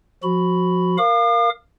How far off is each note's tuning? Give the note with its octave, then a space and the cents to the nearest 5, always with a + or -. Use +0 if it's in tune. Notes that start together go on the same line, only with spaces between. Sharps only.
F3 +20 F#4 +0 B5 +5
A#4 +0 F5 -5 D6 +45